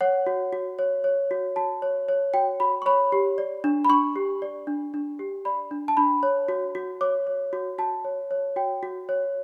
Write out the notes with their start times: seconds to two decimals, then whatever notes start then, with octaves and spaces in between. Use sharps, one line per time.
0.01 C#5 F#5
0.27 F#4
0.53 F#4
0.79 C#5
1.04 C#5
1.31 F#4
1.56 F#4 A5
1.82 C#5
2.08 C#5
2.34 F#4 G5
2.60 F#4 B5
2.82 C#6
2.86 C#5 B5
3.12 G4
3.38 D5
3.64 D4
3.85 B5
3.89 D4 C#6
4.16 G4
4.42 D5
4.67 D4
4.94 D4
5.19 G4
5.45 D5 B5
5.71 D4
5.88 A5
5.97 D4 B5
6.23 C#5
6.48 F#4
6.75 F#4
7.01 C#5 D6
7.27 C#5
7.53 F#4
7.78 F#4 A5
8.04 C#5
8.31 C#5
8.56 F#4 G5
8.83 F#4
9.09 C#5